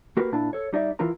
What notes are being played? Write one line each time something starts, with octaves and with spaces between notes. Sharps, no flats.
A#3 F#4 G4 A#4 B4
A#2 A#3 D4 E4 A5
A4 C#5
G3 D#4 D5 E5
D#2 E3 E4 F4 A#4 A#5